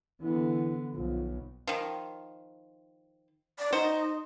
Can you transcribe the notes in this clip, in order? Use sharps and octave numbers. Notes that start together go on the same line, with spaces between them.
D3 E3 B3
B1 F3
D#3 F3
D5
D#4 F#4 C5